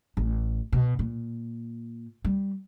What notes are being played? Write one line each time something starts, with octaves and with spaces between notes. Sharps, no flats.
A1
B2
A#2
G3